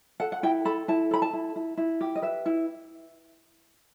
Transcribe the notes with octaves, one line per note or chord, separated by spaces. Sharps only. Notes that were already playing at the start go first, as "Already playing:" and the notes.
A4 F#5
F#5
E4 G5
A4 B5
E4 A5
A4 B5
A5
E4
E4
E4
G4
D#5
B4 E5
E4